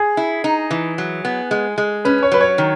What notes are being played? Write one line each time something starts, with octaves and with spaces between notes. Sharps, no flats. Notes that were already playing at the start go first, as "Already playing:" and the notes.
Already playing: G#4
E4
D#4
E3
F#3
B3
G#3
G#3
C#4 B4
C#5
F#3 B4
C#5
D#3